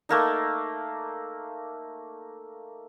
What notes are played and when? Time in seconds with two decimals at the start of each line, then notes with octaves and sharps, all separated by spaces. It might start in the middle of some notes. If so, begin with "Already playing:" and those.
0.09 A3 A#3 D#4